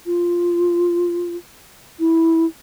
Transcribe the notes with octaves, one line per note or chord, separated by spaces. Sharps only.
F4
E4